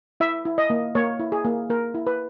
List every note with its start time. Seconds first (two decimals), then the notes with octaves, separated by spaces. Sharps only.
0.20 E4 E5
0.45 E4
0.58 D#5
0.70 A#3
0.95 A#3 C#5
1.19 E4
1.32 G#4
1.45 A#3
1.70 A#3 A#4
1.94 E4
2.07 B4